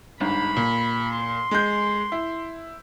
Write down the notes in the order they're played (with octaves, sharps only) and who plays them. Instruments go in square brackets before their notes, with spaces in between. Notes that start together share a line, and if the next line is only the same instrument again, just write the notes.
[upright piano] G1 G#2 [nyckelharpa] B5
[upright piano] A#2
[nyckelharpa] C6
[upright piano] G#3 G6
E4